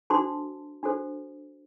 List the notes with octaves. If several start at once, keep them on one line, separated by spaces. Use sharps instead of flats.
D4 F#4 A4 C5 A5 C6
D4 F#4 A4 C5